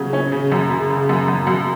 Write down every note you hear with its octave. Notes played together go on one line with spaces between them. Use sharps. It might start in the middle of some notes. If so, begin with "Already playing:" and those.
Already playing: C#3 F#3 C#4
C#4
C#3
F#2
C#3
C#3
F#2
F#2
F#2